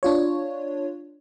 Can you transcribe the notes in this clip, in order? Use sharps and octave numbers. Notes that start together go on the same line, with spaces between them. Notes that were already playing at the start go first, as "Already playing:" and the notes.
D4 F4 C#5